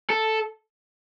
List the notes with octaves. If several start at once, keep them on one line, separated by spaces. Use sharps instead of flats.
A4